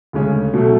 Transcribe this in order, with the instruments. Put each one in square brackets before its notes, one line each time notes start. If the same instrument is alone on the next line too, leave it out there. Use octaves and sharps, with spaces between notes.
[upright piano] D2 C#3 G#3 C#4
B2 F#3 A3